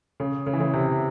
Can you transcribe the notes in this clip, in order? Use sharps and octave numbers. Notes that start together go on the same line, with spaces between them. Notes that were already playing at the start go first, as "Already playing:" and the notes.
C#3
C#3
E3
C#3
C3